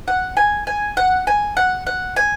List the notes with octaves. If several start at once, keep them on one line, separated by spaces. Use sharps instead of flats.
F#5
G#5
G#5
F#5
G#5
F#5
F#5
G#5